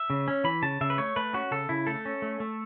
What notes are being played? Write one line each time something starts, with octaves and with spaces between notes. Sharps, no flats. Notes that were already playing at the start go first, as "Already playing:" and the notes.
Already playing: E5
C#3
C#4
E3 B5
C#3 A5
C#3 E5
B4
A3 C#5
A3 B4
C#4 F#4
C#3 A4
C#3 E4
A3 A4
C#4
A3
A3